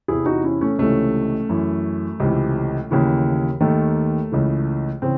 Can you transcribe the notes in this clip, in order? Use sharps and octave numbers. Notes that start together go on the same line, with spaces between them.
E2 C3 E3 E4 G#4
D#4 F#4
C#4 E4
A3 C#4
C#2 C3 E3 A3 C#4
F#2 E3
C#2 C3 E3
D#2 C#3 E3
D#2 D#3 A3
C#2 C#3 E3
C#3 E3 C4